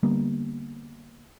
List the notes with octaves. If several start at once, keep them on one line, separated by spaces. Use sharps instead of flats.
D3 G3 A#3 B3